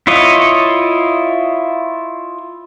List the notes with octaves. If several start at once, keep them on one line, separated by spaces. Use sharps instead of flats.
E4 F4 C#5 D#5